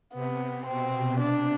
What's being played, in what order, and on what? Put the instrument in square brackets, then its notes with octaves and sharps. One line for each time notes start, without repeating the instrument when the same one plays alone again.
[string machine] C3 [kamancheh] B3
[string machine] B2 [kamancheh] C4
[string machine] C3 [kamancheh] D4